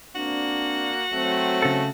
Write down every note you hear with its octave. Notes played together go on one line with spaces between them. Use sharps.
A#3 C4 D4 F#4
F#3 A3 C4
C#3 A4